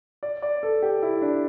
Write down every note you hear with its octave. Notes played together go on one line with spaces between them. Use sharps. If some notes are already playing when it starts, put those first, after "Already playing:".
D5
D5
A4
G4
E4
D4